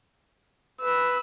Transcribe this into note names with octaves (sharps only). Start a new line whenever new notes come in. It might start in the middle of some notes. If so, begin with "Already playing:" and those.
B4 E6